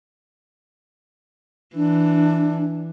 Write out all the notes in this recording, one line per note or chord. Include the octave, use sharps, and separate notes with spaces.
E3 D4